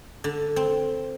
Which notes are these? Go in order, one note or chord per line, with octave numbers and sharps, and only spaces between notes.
D3
C4